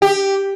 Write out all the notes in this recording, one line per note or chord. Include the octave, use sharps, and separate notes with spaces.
G4